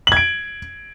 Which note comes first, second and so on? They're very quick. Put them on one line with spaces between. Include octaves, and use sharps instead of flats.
F#7 G#6 D7